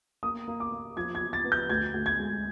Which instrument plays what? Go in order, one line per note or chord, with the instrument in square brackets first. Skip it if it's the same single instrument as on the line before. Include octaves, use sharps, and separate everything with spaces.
[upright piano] A#3 [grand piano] D#6
[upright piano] A#3
[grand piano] D6
[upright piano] A#3
[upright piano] F3 [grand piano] G#6
[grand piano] G#6
[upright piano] F3
[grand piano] A6
[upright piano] B3
[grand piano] G6
[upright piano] D2 [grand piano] G#6
[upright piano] D2
[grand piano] G#6
[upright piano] G#3